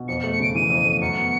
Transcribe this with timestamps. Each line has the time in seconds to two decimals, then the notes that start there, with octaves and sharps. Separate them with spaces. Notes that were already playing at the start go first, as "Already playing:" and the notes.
Already playing: B2
0.08 F2 C#7
0.20 C#7
0.24 A3
0.32 C#7
0.39 C#3 D7
0.55 E3 D#7
0.70 F2
0.86 A3
1.01 F#2 C#7
1.16 B3